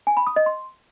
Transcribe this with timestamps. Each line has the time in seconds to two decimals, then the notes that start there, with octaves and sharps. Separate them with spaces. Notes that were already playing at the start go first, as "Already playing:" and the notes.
0.07 G#5
0.17 B5
0.27 D#6
0.36 D#5
0.46 C6